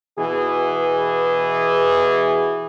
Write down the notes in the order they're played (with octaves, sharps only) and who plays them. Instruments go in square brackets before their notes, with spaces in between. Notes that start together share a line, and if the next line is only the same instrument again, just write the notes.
[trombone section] B2 E3 G#4